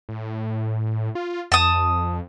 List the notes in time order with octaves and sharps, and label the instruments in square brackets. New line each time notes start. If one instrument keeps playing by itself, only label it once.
[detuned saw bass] A2
F4
[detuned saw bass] F2 [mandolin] A5 D#6